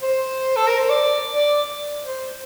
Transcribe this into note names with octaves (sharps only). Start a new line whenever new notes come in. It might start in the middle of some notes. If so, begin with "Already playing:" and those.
C5
A4
A#4
C5
D5
D5
C5